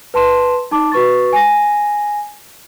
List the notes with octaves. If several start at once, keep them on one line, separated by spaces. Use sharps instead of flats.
B4 A5 C6 E7
D#4 A5 D6
F#4 B4 C#6 A6
G#5 A#6